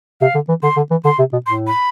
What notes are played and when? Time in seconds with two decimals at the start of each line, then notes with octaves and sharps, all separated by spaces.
0.21 C3 F5
0.35 D3
0.48 E3
0.63 D3 C6
0.76 D3
0.91 E3
1.05 D3 C6
1.19 C3
1.32 B2
1.46 A2 C6
1.67 B5